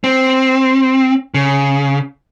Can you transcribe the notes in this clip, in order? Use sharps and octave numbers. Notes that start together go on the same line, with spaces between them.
C4
C#3